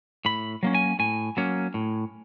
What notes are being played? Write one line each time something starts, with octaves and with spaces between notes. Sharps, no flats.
A2 B5
F#3 A#3 C#4
G#5
A2 G#5
F#3 A#3 C#4
A2